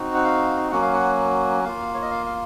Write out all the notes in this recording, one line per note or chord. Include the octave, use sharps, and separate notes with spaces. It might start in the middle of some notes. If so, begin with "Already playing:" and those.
Already playing: C4 D#4 F#4
F#5
F5
F#3 A#3 C#4 F#4 F#5
F5
F#5
A#3 F4 F5
C#5
D#5
F5
F5